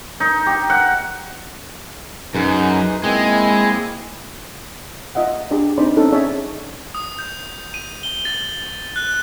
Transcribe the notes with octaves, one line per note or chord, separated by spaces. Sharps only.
D#4
G4
F#5
F#2 D#4 G#4 B4
G#3 A#3 C4 E4
F4 D#5 E5 F#5
D4 G4 G#4 D5
C4 D4 D#4 C5 D5 B5
C4 C#4 D#4 A4
C#4 G#4 C#5 D5 E5 A5
D#6
G6
D#7
G7
A6
F#6